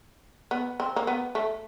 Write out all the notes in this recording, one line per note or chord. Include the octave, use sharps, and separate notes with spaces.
B3
C4
A#3
B3
A3